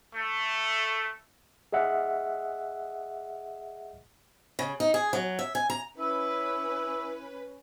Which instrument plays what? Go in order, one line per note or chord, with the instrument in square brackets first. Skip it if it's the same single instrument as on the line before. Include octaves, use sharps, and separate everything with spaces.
[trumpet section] A3
[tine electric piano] G#4 D#5 E5 F#5
[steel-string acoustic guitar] C#3
D#4
G#4
F#3
E5
G#5
A#5
[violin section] C#4 B4 [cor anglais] E4